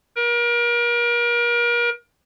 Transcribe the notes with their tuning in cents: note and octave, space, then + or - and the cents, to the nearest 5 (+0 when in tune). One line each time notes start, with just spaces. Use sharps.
A#4 +35